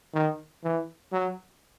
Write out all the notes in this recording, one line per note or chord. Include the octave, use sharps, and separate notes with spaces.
D#3
E3
F#3